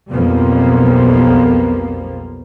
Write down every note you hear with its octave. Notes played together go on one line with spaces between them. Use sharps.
B1 F2 F3 G3 A#3 B3